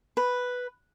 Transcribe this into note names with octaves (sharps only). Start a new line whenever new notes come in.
B4